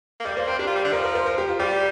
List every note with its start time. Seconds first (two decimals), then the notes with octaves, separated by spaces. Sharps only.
0.20 A#3
0.25 G3 D5
0.36 A#3 C5
0.48 C4 A#4
0.59 D4 G4
0.67 F4
0.75 G3
0.85 D3
0.93 F3 A#4
1.04 A#4
1.15 C5
1.26 A#4
1.38 G4
1.49 F4
1.60 G3 G4